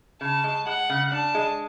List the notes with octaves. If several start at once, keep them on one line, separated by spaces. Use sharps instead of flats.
C#3 A5
G#3
G#3 F#5
C#3
D4 A5
G#3